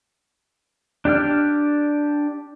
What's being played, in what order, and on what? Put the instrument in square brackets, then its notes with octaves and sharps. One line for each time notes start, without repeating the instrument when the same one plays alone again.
[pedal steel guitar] D4 G4 D5 F6